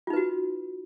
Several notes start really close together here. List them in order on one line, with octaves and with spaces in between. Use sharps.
F4 D#4 B4 F#4